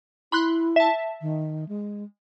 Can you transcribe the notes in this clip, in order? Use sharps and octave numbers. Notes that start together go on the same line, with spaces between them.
E4 B5 C6 F#6
E5 A5
D#3
G#3